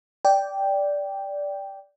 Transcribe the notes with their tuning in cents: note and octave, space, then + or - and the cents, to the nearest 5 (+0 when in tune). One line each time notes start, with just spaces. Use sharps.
D5 -10 G5 +0